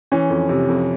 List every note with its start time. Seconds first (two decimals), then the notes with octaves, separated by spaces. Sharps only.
0.12 E3 C#4
0.30 F2
0.49 C3
0.68 F2